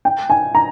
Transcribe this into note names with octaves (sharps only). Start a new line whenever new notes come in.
G5
G#5
A#5